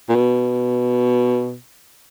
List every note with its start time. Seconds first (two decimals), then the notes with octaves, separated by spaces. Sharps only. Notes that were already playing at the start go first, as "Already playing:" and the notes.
0.09 A#2
0.15 B2